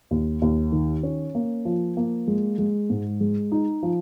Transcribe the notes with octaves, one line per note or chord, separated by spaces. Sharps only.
D#2
D#2
D#3
C#4
A#3
F3
A#3
G#3
G#3
G#2
G#3
D#4
F3